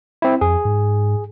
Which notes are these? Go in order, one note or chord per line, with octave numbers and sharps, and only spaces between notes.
C4 E4
F2 G#4
G#2